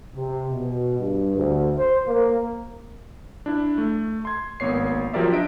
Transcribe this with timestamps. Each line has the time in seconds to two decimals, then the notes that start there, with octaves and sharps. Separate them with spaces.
0.16 C3
0.51 B2
0.99 G2
1.36 D2
1.78 C5
2.08 A#3
3.46 D4 E4
3.78 A3
4.25 C6 G#6
4.60 G#1 A#3 B3 C#5 C7
5.13 F3 F#3 G4 A#4 D5 E5
5.32 D4 D#5 E5 D7